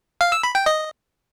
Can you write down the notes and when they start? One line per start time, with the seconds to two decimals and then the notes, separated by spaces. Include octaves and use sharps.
0.21 F5
0.32 E6
0.43 B5
0.55 G5
0.66 D#5